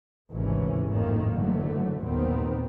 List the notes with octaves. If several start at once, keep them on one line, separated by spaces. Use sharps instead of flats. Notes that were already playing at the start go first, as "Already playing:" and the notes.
G#1 D2 C3 E3 C#4
G#1 F2 A2 D#3 A#3
F#1 F#2 D3 E3 F#3 A3
G1 D#2 A#2 D#3 B3 C4